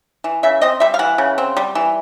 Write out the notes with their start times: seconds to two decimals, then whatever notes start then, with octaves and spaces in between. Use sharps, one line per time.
0.24 E3
0.43 C#3 E5
0.62 C4 D#5
0.80 G3 E5
0.94 F5
0.99 E3 F#5
1.18 C#3
1.38 C4
1.57 G3
1.75 E3